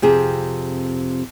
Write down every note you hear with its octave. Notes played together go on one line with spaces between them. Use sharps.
F2 C3 G#4